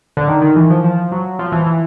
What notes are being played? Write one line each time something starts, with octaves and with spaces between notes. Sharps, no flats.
D3
D#3
D#3
E3
F3
F3
F#3
F3
E3
E3